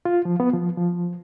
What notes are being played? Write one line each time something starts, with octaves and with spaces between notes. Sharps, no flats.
F4
F3
B3
F3
F3